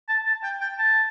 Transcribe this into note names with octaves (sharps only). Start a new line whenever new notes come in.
A5
A5
G5
G5
A5